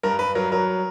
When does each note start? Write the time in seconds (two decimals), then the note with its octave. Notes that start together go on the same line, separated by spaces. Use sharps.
0.03 G2 A#4
0.19 G2 B4
0.35 F#3 A#4
0.51 F#3 A#4